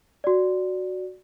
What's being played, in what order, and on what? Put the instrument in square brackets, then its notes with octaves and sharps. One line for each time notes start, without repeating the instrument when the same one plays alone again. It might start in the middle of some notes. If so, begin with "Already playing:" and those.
[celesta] F#4 D5